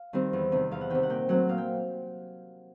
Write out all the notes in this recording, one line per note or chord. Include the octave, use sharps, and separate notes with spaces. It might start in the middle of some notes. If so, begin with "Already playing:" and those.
Already playing: F5
D#3 G3 C4
E2
C3 D#3
E2 F5
F#5
C3 D#3 G5
F#5
A#2 G5
F#3 A3 C4 F#5
A#2 F5
G5